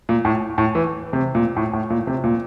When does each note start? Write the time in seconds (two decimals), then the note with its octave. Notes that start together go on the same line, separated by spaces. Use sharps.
0.09 A#2
0.25 A2
0.58 A2
0.75 E3
1.13 C3
1.35 A#2
1.57 A2
1.73 A2
1.90 A#2
2.07 C3
2.24 A#2